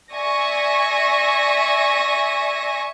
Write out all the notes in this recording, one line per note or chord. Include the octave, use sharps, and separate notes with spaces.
D5 E5 G#5 C#6 A#6